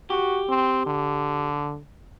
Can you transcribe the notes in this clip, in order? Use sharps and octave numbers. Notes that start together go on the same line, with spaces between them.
F#4 G4
C4
D3